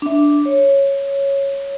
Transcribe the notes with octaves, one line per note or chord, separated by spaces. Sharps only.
D4 E5
C#5